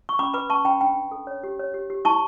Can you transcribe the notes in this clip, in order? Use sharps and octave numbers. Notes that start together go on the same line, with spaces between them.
C#6
C#4 B5 D6
B4 B5 D6
C#4 A5 C#6
C#4 G5 B5
D4 G5 B5
D4
A4
C#5
G4
C#5
G4
G4
E4 A5 C#6